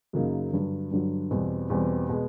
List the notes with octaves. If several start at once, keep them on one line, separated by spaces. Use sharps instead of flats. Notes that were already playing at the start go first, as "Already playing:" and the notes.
F#2 C#3 F#3 A#3 D#4
G2 D3 F#3
G2 D3 F#3
E2 B2 G3 C4
E2 B2 G3 C4
B2 G#3